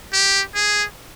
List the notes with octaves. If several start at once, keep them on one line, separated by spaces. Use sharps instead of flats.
G4
G#4